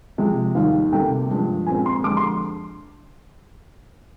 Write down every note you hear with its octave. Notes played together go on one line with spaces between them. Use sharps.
F2 C3 F3 G#3
D#2 D#3 G3 F5
D2 C3 G3 A#3 G5
G2 F3 G#3
A#2 G#3 C4 G#5
C6
F2 D3 G#3 D6
C6